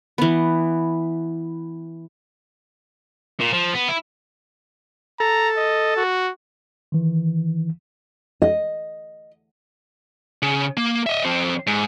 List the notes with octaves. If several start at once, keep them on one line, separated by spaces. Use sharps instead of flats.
E3 B3
A#2
F3
B3
E4
A4 A#5
D#5
F#4
D#3 E3
D#5
C#3
A#3
D#5 E5
F2 C4
G#2